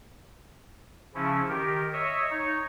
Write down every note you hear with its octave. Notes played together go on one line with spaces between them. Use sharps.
C#3 F3 C#4 E4
D#3 G4 A#4
C#5 D#5 E5
D#4 C#5